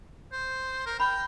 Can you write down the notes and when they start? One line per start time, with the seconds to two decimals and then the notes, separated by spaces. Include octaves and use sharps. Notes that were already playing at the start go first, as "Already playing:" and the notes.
0.32 C5
0.86 A#4
1.00 G5 B5